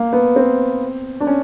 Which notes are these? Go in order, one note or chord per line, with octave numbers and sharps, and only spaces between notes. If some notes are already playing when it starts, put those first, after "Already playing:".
Already playing: A#3
B3
C4
D4
C#4